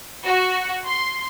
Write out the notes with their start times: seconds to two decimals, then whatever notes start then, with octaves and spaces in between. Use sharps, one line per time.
0.24 F#4
0.86 C6